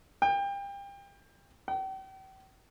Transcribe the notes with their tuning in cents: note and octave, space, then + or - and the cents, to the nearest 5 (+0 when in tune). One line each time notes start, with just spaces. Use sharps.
G5 +30
G5 -40